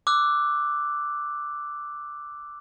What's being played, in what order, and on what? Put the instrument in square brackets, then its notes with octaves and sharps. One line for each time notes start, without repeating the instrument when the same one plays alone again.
[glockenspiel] D6 E6 F#6